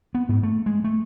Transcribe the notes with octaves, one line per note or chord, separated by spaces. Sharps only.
B3
G#2
A3
G#3
A3